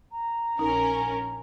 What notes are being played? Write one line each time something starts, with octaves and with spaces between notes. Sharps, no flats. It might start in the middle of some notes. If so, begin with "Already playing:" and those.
A#5
A#1 C#4 D#4 A#4